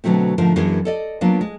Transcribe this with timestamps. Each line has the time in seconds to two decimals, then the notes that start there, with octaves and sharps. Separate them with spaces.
0.04 B2 D3 F#3 A3 C4
0.38 G#2 D3 F3 A3 A#4
0.56 F#2 E3 F#3 A#3 D4 G#4
0.85 A4 D5 D#5
1.21 F#3 A#3 B3 D4 F4
1.41 G#3